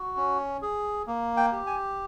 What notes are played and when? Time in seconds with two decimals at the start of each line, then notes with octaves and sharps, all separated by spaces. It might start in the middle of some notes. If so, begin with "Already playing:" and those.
Already playing: F#4
0.17 C#4
0.62 G#4
1.07 A#3
1.37 G5
1.52 G4
1.67 G#5